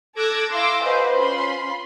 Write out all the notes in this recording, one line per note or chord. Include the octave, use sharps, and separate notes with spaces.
A4 D6 E6 F#6 G#6 A#6
E4 F5 C6 D6 E6 A#6
F#4 G#4 B4 C5 D#5 F5
C#4 F4 B5 C6